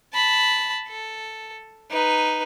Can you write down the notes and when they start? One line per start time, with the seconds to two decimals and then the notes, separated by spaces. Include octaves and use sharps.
0.13 A5 B5
0.88 A4
1.91 D#4 B4